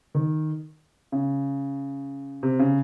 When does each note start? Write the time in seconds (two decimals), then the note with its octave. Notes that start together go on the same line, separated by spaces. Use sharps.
0.15 D#3
1.12 C#3
2.43 C3
2.59 C#3